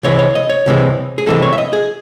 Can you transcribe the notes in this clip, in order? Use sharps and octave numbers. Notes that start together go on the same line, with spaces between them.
C2 C3 E3 G#3 C#5
C#5
D#5
C#5
C2 C3 E3 G#3
G#4
C2 C3 E3 G#3 A4
C#5
E5
D#5
G#4